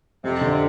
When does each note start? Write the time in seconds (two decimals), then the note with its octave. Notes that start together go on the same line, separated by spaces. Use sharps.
0.24 F2 C3
0.41 D3